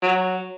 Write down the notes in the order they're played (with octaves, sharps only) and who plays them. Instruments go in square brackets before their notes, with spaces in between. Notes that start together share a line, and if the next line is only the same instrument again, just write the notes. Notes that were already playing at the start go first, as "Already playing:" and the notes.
[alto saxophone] F#3